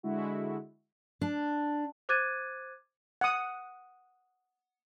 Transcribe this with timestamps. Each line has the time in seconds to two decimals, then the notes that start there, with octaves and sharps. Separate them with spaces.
0.03 D3 G#3 E4 F#4
1.21 D4
2.09 C5 D6 F#6 G#6 A6 D#7
3.21 F#5 D#6